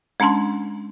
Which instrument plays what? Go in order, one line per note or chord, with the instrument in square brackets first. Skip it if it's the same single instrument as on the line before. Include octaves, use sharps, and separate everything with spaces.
[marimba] G#3 C#4 D4 A5 C6